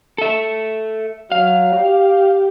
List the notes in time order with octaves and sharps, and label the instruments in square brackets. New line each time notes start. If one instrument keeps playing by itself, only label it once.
[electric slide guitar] A4 E5
[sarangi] F#3 [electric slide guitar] F5
[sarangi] G4